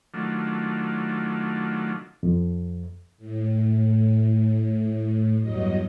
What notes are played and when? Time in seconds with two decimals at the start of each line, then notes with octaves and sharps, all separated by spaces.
0.14 D#3 F#3 A3 D4 F4
2.23 F2
3.18 A2
5.40 E2 G2 F#3 D#5